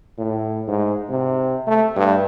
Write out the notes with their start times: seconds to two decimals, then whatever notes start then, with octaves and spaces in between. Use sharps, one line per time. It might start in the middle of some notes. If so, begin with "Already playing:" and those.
0.18 A2
0.68 G#2
1.10 C3
1.67 A3
1.96 G2